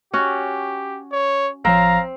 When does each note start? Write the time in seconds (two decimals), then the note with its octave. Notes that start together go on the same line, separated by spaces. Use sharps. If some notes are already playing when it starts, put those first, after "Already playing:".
0.13 C#4 F#4 G4
1.12 C#5
1.65 A1 F3 C4 C#5 F5 A#5